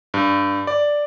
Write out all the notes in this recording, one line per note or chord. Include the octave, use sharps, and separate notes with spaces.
G2
D5